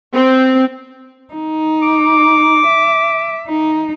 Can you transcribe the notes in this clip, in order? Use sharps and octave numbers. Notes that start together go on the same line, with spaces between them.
C4
D#4
D6
E5
D#4